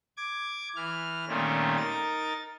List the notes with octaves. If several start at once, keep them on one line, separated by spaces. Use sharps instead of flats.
D6 G#6
E3 F6
A#2 D#3 G3 A3 C4 C#4
D#4 A#4 A6